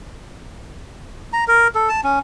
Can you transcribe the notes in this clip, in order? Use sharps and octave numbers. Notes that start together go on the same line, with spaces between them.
A#5
A#4
A4
A5
C#4